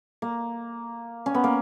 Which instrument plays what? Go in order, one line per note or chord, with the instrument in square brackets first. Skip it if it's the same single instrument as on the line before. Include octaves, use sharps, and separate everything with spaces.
[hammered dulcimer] A#3
C#4
B3
A#3